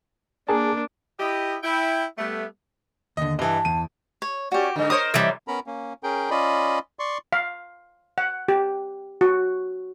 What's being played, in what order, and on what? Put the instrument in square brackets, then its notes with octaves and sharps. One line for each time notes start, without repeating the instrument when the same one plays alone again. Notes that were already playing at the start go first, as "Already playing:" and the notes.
[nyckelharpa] A#3 D4 [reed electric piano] G#4 A#4 A5
[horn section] E4 G4 D#5
E4 G5
G3 A3 B3
[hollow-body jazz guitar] D#2 D3 [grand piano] D#5
[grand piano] G2 E3 [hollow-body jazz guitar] D#5 [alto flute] A5
[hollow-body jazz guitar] E2 [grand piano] D#7
[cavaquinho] C#5
[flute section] C#4 D5 C#6 [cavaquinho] F#4 G4
[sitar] G#2 D3 [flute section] D#5
[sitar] A#4 C5 C#5 [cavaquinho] D#6
[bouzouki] E3 G3
[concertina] B3 C#4 A#4 A#5 B5
A#3 C#4
C#4 G#4 A#4 G5
C#4 F4 D5 D#5 B5
D5 C6 C#6
[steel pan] F5
F#5
G4
F#4